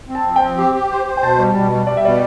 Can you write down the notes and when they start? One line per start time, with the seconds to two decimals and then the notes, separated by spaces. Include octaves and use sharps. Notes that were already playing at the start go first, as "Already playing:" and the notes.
0.09 C4
0.15 A5
0.26 F3
0.36 G5
0.42 C4
0.58 G4
0.74 G4
0.91 C5
1.07 C5
1.17 G5
1.22 B2 A5
1.38 G3
1.54 B2 A5
1.71 G3
1.87 G3 D5
1.97 E5
2.04 B2 D5